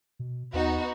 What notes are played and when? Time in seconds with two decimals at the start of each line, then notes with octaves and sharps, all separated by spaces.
0.19 B2
0.53 D#2 B3 D#4 F#4